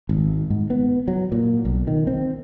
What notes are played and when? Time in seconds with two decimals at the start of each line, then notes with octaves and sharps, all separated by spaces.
0.09 G#1
0.50 G#2
0.70 B3
1.08 F#3
1.32 A#2
1.65 B1
1.87 D#3
2.07 C4